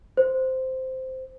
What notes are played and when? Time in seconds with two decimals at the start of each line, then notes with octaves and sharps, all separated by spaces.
0.17 C5